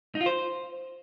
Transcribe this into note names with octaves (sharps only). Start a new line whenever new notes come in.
D#4
F4
C5